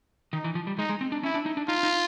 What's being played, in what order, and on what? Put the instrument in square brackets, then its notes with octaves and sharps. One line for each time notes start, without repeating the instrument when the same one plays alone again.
[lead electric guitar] D#3 [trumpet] D#4
[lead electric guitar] E3
F3
G3
[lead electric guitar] G#3 [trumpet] D#4
[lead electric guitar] G#3
C4
D4
[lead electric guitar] C#4 [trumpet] E4
[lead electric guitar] D4
D#4
D4
[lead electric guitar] D#4 [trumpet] F4
[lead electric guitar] D#4